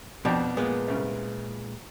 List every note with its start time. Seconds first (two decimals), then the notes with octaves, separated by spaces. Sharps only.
0.25 F2 B2 D4 G5
0.57 A#2 G#3 B3
0.88 C2 C#3